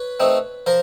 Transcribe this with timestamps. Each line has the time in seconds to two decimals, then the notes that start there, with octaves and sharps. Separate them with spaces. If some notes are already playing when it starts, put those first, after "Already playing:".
Already playing: B4 C#5
0.20 A3 C4 D#4
0.66 F3 A#4 C5